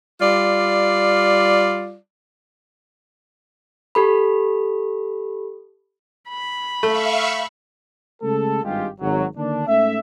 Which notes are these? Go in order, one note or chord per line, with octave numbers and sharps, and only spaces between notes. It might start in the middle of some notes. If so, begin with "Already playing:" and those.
G3 F4 D5
G4 A4 B5
B5
A3 E5 F5 C#6
C#3 G#3 A3 A4
G#1 G2 G3 G#3 F4 G4
G#1 F#3
D3 D#3 A#3 D4
G#2 A3 C#4 E5